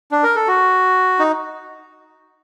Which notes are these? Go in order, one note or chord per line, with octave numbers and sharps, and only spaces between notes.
D4
A#4
A4
F#4
D#4